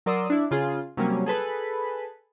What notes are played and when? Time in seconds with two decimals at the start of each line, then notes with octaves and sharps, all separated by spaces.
0.06 F#3 A#4 D5 C6 D#6 E6
0.30 D4 E4
0.51 C#3 F4 G#4
0.97 C3 F#3 G3 A#3 C#4
1.26 G#4 A4 B4 B5